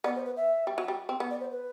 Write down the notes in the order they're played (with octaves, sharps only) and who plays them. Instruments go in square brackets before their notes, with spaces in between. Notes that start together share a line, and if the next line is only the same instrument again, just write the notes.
[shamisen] B3 [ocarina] D5
[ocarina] C5
B4
E5
[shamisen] G3
F#3
G3
C4
B3
[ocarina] D5
C5
B4